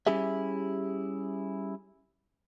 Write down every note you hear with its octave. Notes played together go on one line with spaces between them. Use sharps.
G3 C#4 E4 G4 G#4 E5